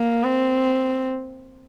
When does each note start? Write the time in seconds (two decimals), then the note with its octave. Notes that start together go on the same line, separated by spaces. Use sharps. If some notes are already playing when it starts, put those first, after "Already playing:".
Already playing: A#3
0.24 C4